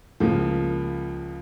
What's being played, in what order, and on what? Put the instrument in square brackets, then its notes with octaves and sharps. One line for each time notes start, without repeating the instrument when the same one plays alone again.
[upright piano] C#2 C#3 F3 A#3